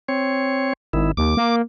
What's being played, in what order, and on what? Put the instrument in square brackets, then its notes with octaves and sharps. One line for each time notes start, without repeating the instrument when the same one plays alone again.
[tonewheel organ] C4 C#5
[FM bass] G#1 [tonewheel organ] D#3 E4
[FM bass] D#2 [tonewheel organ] D6
[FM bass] A#3